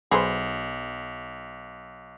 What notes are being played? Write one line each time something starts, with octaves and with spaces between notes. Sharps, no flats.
B1 G#4 B4 C5